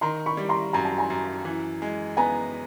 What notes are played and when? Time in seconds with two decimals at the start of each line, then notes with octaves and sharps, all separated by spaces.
0.01 D#3 A#5 C6
0.26 B5 C#6
0.37 G3
0.49 A#5 C6
0.73 F#2 A#5
0.85 A5
0.98 G#5 A#5
1.10 F#2
1.45 E3
1.82 G#3
2.17 B3 G#5 A#5